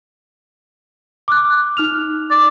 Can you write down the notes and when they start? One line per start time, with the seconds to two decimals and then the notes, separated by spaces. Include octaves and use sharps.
1.28 D6 F6 F#6
1.77 D#4 F6 F7
2.30 D5